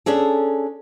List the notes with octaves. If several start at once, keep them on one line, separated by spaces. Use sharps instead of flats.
C#4 D4 G#4 A4